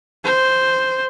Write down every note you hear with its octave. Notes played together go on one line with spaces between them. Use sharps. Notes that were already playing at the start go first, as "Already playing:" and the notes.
C5